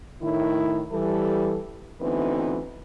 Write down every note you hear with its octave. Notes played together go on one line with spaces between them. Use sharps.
A2 D#3 E4
E3 G3 A4
D2 E3 B3 C4 D#4 B4